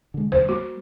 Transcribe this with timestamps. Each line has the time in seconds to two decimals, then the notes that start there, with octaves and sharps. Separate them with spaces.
0.14 D3 G#3
0.32 D#2 D3 G3 C5
0.49 G3 A#3 F#4